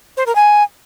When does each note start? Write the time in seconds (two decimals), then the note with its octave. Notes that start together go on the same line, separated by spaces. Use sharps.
0.17 C5
0.26 A#4
0.35 G#5